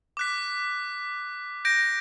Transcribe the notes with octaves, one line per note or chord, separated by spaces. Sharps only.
D6 F#6 B6
G6 A#6 D7